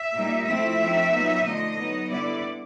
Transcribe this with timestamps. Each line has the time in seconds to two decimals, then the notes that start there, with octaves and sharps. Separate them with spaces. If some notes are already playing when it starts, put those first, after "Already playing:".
Already playing: E5
0.14 A#2 G3 A#3 D#4
0.46 F3 A3 C4 E4 E5
0.79 F3 A3 C4 D#4
1.12 A#2 F#3 B3 D#4
1.45 D3 F3 A3 D#5
1.77 F#3 B3 D#4
2.10 D3 G3 B3 E4 D5